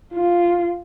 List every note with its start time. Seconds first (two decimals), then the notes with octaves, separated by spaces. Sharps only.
0.13 F4